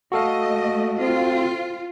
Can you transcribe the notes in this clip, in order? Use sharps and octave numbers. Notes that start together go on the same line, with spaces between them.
A3 F#4 A4 D#5 F5
C4 F4